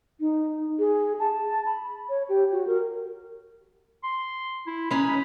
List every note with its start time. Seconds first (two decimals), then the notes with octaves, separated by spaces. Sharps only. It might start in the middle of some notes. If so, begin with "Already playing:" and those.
0.20 D#4
0.79 G#4
1.19 A5
1.66 B5
2.09 C#5
2.29 G4
2.52 F#4
2.67 A#4
4.03 C6
4.67 E4
4.91 G#3 C#4 D#4 B5